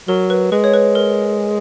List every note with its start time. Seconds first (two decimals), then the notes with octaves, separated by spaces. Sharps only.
0.08 F#3 A#4
0.30 B4
0.52 G#3 B4
0.64 C#5
0.74 B4
0.95 A#4